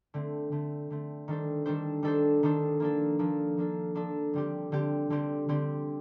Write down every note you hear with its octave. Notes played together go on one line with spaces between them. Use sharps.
D3 A3 C4
D3 A3 C4
D3 A3 C4
D#3 G3 D4 A4 C5
D#3 G3 D4 A4 C5
D#3 G3 D4 A4 C5
D#3 G3 D4 A4 C5
F3 A#3 D4 A4
F3 A#3 D4 A4
F3 A#3 D4 A4
F3 A#3 D4 A4
D3 G3 C4 G4
D3 G3 C4 G4
D3 G3 C4 G4
D3 G3 C4 G4